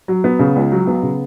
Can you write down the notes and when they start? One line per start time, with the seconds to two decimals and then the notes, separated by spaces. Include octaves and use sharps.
0.08 F#3
0.24 B3
0.39 C#3
0.56 C#2
0.72 F#3
0.87 B3
1.03 C#3